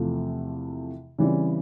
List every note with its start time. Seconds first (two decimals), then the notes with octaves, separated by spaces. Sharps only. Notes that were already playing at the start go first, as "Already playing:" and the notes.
Already playing: E2 C3 F3 A3
1.19 C#3 E3 G3 C4